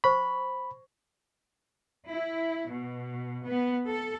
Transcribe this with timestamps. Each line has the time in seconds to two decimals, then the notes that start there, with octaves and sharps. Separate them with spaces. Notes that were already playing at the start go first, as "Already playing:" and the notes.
0.04 C5 B5 C#6
2.09 E4
2.71 B2
3.46 B3
3.88 A4